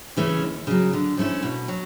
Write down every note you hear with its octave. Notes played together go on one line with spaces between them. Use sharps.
C#3 E3 A3 C#4
D#2
C#3 F#3
D3
F3 A3 C#4 E4
B2
F#3